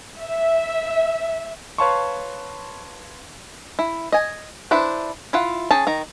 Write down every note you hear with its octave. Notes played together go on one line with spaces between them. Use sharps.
E5
B4 C#5 F5 A5 C6 C#6
E4
D#5 G#5
D4 E4 B4 C5
E4 F4 F#5
C#4 G#4 G5 A5
D#3 A#5